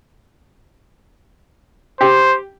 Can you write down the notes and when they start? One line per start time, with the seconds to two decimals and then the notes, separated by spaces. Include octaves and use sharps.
2.01 G4 C5